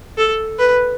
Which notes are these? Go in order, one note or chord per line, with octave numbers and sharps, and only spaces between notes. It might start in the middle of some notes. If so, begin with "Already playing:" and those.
A4
B4